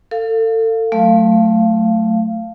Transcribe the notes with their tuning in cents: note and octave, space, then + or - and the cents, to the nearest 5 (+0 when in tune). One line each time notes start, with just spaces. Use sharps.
A4 +30 F5 +0
F#3 +0 A3 +0 F5 -15